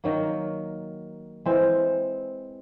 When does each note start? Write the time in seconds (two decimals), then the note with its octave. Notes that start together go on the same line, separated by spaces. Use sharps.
0.04 D#3 F#3 A#3
1.46 E3 G#3 C4